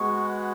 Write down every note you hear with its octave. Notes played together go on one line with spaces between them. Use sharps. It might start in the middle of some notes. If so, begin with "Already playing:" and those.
Already playing: G#3 B3 F#4 C#6